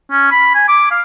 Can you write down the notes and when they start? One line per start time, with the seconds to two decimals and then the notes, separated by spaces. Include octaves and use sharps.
0.11 C#4
0.31 B5
0.55 G#5
0.68 D6
0.91 F5